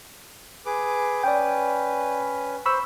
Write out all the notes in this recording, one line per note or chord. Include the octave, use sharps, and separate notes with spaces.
G#4 B4 D6
C#4 B4 D5 G5
C5 B5 C#6 E6